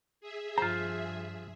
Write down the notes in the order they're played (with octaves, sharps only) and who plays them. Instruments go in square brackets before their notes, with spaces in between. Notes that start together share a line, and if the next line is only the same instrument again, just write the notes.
[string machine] G#4 E5
[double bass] G2 F3 [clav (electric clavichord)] F4 C5 [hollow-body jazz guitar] A#5